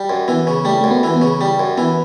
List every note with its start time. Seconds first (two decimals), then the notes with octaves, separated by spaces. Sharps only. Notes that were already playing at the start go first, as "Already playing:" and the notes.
Already playing: G3
0.10 F#2
0.28 E3 B3
0.47 C#3
0.65 G3 A3
0.81 F#2 A3
0.91 B3
1.03 E3
1.16 B3
1.22 C#3
1.41 G3
1.60 F#2
1.78 E3 B3